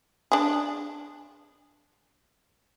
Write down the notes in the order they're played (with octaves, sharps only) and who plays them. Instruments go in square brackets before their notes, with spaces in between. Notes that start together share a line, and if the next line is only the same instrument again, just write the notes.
[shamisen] D4 G#4